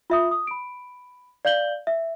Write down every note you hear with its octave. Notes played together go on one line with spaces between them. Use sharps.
F4 E5 D#6
D#6
B5 D7
D5 F5 G6 F#7 G7
E5